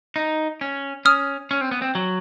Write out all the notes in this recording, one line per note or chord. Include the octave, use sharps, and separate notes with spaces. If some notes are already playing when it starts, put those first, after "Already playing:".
D#4
C#4
C#4 D#6 F6
C#4
C4
B3
C4
F#3